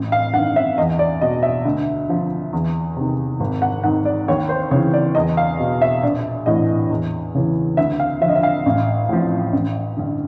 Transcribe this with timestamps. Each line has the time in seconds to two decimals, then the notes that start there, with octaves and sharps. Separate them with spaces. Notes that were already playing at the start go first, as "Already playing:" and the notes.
Already playing: A1
0.12 F5
0.34 G2 D#3 F#5
0.56 E5
0.78 E2 D#5
0.99 D5
1.21 B2 D#5
1.43 E5
1.65 D2
2.09 D3 F3
2.53 E2
2.97 C3 D#3
3.40 G#1
3.62 F#5
3.84 G#2 D#3 F#5
4.05 D5
4.28 D#2 C#5
4.49 C5
4.71 C#3 C#5
4.74 E3
4.94 D5
5.15 E2 D#5
5.37 F5
5.59 B2
5.82 E5
6.03 A#1 D5
6.46 A2 E3 D#5
6.90 E2
7.35 C#3 E3
7.77 D2 E5
8.00 F5
8.21 F3 E5
8.25 D3 D#5
8.36 E5
8.43 F5
8.66 A1
9.09 A2 F3
9.53 A1
9.97 G2 D3